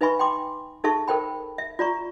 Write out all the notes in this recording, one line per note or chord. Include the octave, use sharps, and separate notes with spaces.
D#4 B4 E5 G#5 B5 C#6
G5 C6 D6
D#4 G#4 A4 E5 A5 C#6
A4 A#4 C5 G5 B5
E5
F4 D5 A#5 C#6